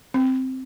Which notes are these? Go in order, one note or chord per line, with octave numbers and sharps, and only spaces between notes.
C4